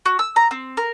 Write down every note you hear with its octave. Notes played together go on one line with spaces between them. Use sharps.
F#4
E6
A#5
C4
A#4